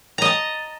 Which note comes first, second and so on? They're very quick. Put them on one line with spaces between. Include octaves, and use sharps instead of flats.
A#5 D#5 A5